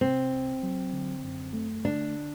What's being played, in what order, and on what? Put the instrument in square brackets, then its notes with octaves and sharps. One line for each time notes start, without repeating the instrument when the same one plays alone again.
[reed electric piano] C3 [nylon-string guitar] C4
[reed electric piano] C2
F#3
D3
F#2
A3
[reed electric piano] D3 [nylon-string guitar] D4